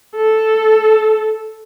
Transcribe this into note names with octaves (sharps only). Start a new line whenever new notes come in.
A4